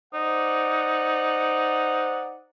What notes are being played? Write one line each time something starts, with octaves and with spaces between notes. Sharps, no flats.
D#4 C5 D5 F#5